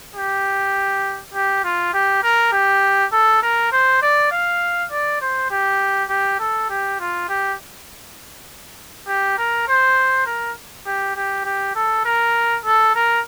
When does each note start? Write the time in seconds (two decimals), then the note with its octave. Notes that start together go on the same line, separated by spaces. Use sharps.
0.15 G4
1.34 G4
1.64 F4
1.94 G4
2.23 A#4
2.52 G4
3.12 A4
3.42 A#4
3.72 C5
4.02 D5
4.32 F5
4.91 D5
5.21 C5
5.50 G4
6.09 G4
6.40 A4
6.69 G4
6.99 F4
7.29 G4
9.07 G4
9.38 A#4
9.68 C5
10.26 A#4
10.86 G4
11.16 G4
11.45 G4
11.75 A4
12.05 A#4
12.65 A4
12.95 A#4